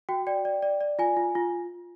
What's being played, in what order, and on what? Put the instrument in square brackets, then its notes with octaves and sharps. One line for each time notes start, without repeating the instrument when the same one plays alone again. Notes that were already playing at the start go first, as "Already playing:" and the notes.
[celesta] F#4 G5
D5 G5
D5
D5
D5
F4 G#5
F4
F4